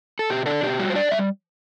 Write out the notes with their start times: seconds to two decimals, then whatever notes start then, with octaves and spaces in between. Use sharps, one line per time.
0.19 A4
0.30 B2 G4
0.46 D4 A4
0.62 B2 G4
0.79 G3 F#4
0.90 C5
0.95 D4 D5
1.11 G3 E5